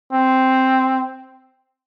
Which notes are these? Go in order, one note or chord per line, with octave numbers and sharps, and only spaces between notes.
C4